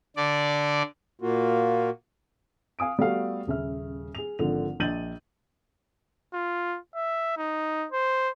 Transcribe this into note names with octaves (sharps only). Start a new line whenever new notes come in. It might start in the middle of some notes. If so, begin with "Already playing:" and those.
D3 D5
A#2 A#3 F4 F#4
F5 G#5 D#6 D7
G3 A3 B3 F#4 A4 F5
D#1 C#3 E5 F6
G#4 F7
G#1 D3 F3 F7
A#1 D#5 G6 A6 D#7 F#7
F4
E5
D#4
C5